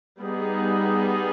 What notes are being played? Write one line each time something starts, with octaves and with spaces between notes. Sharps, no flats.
G3 B3 D#4 G#4